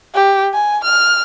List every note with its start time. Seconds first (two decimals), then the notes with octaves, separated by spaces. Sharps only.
0.14 G4
0.54 G#5
0.84 F6